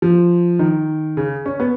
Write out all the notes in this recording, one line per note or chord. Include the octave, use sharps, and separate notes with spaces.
F3
D#3
C#3
C#4
B3